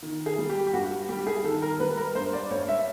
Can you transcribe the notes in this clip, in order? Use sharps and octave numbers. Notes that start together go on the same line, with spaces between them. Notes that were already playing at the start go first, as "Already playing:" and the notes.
D#3
G#4
G3
G4
G4
G2 F#4
G3 G4
G#4
D#3 A4
A#4
G3 B4
A#4
G2 C5
D5
G2 C#5
E5